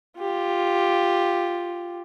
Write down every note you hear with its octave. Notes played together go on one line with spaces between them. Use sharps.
F4 G4